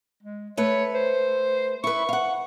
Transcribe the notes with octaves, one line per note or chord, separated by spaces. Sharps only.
G#3
A3 B4 C#5
C5
E4 B4 C#6
F5 F#5